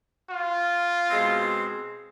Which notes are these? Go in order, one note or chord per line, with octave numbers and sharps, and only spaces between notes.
F4
B2 G#3 C4